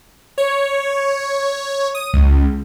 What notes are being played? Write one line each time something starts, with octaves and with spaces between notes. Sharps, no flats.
C#5
D#6
C#2